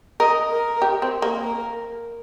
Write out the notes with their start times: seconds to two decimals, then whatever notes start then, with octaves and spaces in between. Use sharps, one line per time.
0.20 A#4 D#5
0.51 A#4
0.82 G4
1.02 C4
1.22 A#3
1.43 A#4